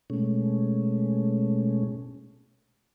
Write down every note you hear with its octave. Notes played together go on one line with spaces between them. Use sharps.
B2 G#3 A3 C#4